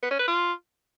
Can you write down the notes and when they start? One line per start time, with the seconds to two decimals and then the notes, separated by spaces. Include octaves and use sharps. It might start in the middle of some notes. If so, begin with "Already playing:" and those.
0.03 B3
0.11 C#4
0.19 B4
0.28 F4